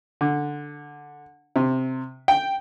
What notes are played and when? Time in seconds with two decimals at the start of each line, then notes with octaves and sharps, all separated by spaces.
0.21 D3
1.56 C3
2.28 G5